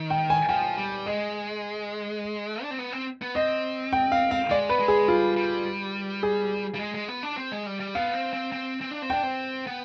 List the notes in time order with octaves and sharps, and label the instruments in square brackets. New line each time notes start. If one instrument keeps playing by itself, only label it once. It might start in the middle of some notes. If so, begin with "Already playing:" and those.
Already playing: [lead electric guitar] D#3
[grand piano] G5
G#5
[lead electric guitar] F3 [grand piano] G5
[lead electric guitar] G3
[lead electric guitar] G#3 [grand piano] D#5
[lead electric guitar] D4
C4
B3
C4
B3
[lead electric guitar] C4 [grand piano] D#5
[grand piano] G5
F5
F5
[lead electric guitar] G#3 [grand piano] D5
[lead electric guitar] B3 [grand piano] B4
[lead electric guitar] G#3
[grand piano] G#4
[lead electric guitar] G3 [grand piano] F4
[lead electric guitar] G3
[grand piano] G#4
[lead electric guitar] G3
G#3
G#3
B3
D4
C4
G#3
G3
G3
[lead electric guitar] B3 [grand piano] F5
[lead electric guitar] C4
C4
C4
C4
D4
C4
[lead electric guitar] D4 [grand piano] G5
[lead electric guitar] C4
B3